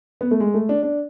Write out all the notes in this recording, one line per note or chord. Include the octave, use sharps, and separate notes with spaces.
B3
A3
G#3
A3
D4
D4